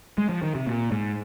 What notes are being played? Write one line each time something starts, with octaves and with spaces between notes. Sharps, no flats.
G#3
F3
D#3
C3
A#2
G#2